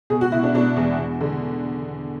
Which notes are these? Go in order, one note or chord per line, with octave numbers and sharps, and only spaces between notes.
B2 G#4
F#4
B2 E4
D4
B2 D4
E2
E2
D3